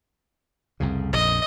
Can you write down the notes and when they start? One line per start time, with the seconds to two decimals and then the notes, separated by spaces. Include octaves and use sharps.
0.80 C2 F2 C#3
1.13 A#1 F2 D#5